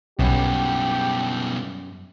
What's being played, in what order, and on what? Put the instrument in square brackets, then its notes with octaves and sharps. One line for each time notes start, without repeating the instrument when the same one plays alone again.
[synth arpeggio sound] B1 [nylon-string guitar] F#2 [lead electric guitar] B2 G3 [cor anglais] G4